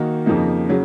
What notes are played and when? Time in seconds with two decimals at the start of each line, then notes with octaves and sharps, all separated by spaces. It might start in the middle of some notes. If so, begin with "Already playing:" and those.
Already playing: D#3 A#3 D#4 F#4
0.26 F2 C#3 F3 A#3 D#4
0.69 C#3 F#3